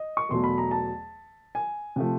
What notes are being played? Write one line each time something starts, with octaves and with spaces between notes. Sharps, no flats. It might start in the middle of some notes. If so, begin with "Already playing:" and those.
Already playing: D#5
C#6
E2 B2 F#3 A3 C6
B5
A#5
A5
G#5
C3 F3 A3